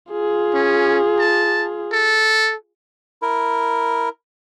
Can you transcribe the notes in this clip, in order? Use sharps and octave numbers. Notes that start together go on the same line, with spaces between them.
F4 G#4
C#4
A5
A4
E4 A#4